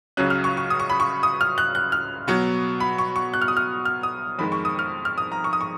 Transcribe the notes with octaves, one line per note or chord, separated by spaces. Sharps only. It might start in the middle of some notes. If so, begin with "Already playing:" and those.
C#2 C#3 F#3 C#4 F#6
F6
C#6
C#6
D#6
C#6
B5
C#6
D#6
F6
F#6
F#6
F6
B2 F#3 B3
B5
C#6
C#6
F#6
F6
D#6
F6
F6
D#6
F2 D#3 G#3 B5
C#6
D#6
F6
F6
D#6
A#5
C#6
D#6
C#6